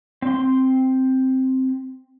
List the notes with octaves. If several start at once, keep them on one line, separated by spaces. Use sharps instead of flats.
C4 C6